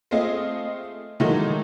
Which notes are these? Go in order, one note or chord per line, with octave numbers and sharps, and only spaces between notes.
A3 C4 F4 G#4 D#5
D#3 E3 F#3 G#3 A3 D#4